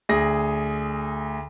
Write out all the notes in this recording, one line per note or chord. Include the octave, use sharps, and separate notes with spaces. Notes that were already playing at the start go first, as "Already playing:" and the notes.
D2 G#4 A#6